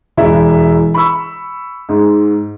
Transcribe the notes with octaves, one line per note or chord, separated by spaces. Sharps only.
E1 E4 E5
B5 C#6 E6
G#2